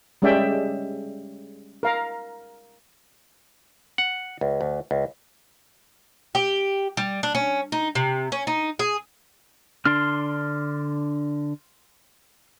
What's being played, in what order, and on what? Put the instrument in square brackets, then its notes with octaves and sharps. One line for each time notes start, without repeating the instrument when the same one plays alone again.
[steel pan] G3 G#3 C#4 D5 E5 G5
A#4 F5 A#5
[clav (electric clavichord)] F#5
C#2
D2
C#2
[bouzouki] G4
G3
D4
C#4
D#4
C3
C#4
D#4
G#4
[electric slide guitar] D3 D4 D5 [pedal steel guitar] C6 F6